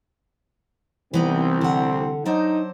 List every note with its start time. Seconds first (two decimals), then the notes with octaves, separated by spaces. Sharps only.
1.14 C2 E3 B3 C4 D#4
1.61 D3 F#5
2.25 F#3 D4 D#4 C5